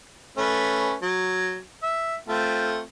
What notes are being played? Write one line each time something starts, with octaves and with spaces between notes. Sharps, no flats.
A3 C#4 B4
F#3
E5
A3 C4 F4